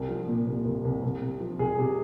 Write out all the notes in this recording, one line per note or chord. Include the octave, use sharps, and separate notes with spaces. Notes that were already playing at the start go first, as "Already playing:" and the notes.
Already playing: C2
F3
A#2
C2
C2
C2
C2
C3
F3
C2 G#4
C3